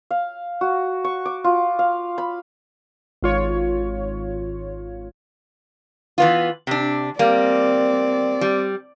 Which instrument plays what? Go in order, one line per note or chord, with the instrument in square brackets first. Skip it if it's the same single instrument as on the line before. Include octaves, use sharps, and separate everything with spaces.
[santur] F5
F#4
C#6
D6
F4
F5
B5
[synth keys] G#1 F4 C#5
[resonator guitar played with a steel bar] E3 B3 F4
C3 D4
[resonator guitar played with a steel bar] G3 A#3 [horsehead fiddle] C4 D5
[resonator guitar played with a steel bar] G3